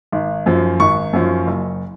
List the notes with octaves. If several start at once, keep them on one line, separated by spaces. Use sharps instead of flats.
G#1
F#2 F3
G#1 C#6
F#2 F3
F#1